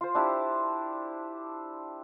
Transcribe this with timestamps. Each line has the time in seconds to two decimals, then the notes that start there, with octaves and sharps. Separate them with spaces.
0.01 F4 C5
0.15 D4 E4 G4